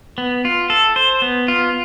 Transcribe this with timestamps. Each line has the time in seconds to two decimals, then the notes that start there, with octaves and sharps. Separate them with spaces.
0.18 B3
0.45 F4
0.70 A4
0.96 C5
1.22 B3
1.48 F4